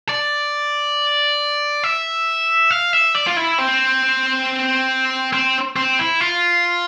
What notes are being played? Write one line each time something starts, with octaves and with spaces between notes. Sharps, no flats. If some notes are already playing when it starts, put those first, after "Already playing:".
D5
E5
F5
E5
D5
F4
E4
C4
C4
C4
E4
F4